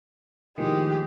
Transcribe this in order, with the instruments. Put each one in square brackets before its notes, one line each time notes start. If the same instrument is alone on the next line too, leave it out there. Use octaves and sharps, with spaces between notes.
[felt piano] D#2 A2 F3 [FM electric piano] D#3 [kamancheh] G#3 G4